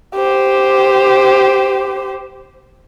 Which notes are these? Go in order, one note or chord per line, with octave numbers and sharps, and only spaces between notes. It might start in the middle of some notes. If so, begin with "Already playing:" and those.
G4 C5